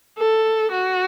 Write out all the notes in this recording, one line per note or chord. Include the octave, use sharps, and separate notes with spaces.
A4
F#4